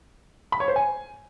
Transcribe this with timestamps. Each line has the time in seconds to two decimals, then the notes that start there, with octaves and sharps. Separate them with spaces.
0.52 B5
0.60 C#5
0.68 C5
0.76 G#5